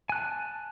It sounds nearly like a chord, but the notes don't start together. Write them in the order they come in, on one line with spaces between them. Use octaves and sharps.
G#5 F#6 A5